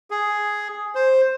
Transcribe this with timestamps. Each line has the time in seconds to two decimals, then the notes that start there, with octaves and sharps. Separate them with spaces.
0.11 G#4
0.95 C5